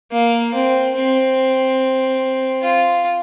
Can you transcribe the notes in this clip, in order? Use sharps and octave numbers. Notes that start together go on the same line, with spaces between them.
A#3
C4
C4
F4